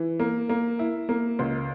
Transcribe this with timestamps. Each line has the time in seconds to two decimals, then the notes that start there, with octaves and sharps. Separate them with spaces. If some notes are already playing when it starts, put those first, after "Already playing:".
Already playing: E3
0.19 A#3
0.49 A#3
0.79 E4
1.09 A#3
1.39 C#2